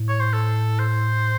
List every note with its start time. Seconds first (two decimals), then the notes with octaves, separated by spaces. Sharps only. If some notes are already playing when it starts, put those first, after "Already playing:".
Already playing: A2
0.08 C#5
0.20 C5
0.33 A4
0.79 C5